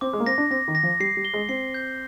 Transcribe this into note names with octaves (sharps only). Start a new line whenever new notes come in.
C4 D6
G#3
A#3
C4 A#6
D4
C4 A#6
D#3
A#6
F3
G3 C7
G3
G7
G#3
C4 C7
G6